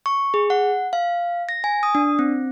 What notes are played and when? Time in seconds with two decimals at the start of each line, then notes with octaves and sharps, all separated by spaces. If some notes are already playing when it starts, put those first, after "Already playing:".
0.06 C#6
0.34 G#4
0.50 F#5
0.93 F5
1.49 A#6
1.64 G#5
1.83 D#6
1.95 D4
2.19 C4